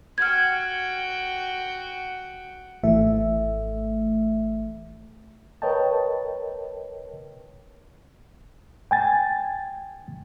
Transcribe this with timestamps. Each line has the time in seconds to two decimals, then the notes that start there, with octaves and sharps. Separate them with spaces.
0.18 F#4 G5 F6 G#6
2.83 G#1 E3 A3 E5
5.62 A#4 B4 C#5 D#5 G5 A5
8.91 G5 G#5 A6